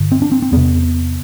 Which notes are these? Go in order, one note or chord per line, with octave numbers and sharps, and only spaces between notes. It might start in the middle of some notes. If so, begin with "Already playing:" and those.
Already playing: G2 D3
C4
D4
C4
C4
E2 C3 B3